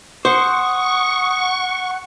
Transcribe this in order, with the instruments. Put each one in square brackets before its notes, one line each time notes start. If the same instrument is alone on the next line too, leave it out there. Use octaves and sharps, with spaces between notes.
[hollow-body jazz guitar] C5 [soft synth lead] F#5 [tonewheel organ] C#6 [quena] D#6